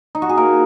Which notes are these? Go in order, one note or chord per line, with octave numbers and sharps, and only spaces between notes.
D#4
F#4
G#4
A#3 A#4